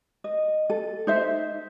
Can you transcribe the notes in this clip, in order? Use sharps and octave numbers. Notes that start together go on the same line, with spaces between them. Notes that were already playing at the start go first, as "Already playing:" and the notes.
D#5
A4
D#4 C5 E5